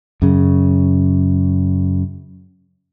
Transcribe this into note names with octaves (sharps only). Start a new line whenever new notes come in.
F#2 C#3